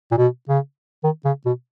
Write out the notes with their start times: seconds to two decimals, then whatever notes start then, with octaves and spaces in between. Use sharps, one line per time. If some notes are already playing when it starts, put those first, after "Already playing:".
0.11 A#2
0.17 B2
0.49 C#3
1.04 D#3
1.25 C#3
1.45 B2